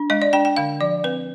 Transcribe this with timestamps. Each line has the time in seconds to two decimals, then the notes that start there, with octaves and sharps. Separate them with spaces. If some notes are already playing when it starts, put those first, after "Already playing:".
Already playing: D4
0.10 G#3 D#5
0.22 D5
0.33 D4 G5
0.45 G5
0.57 D3 F5
0.81 F3 D5
1.04 C4 B4